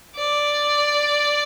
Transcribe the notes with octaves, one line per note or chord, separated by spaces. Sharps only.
D5